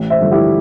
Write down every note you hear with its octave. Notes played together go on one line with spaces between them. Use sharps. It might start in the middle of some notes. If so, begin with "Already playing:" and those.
Already playing: A1
C5 E5
G2 D3 F3
E4 G4